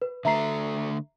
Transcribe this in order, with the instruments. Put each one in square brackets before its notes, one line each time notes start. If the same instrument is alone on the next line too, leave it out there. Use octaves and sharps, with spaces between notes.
[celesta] B4
[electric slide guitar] D3 A3 [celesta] E5 A#5 C7